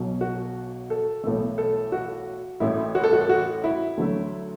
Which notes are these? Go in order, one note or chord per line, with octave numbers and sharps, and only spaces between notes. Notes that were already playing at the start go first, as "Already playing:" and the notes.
Already playing: B1 B2 F#3
F#4
A4
B1 A2 E3 A3
A4
F#4
A1 A2 A3 E4
F#4
A4
F#4
A4
F#4
E4
D2 D3 F#3 A3